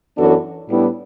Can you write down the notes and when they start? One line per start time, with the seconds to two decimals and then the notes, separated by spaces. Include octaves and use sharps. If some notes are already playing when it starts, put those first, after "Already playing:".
0.17 F#2 E3 B3 D4 F#4 A4
0.69 A2 G3 B3 D4 E4 G4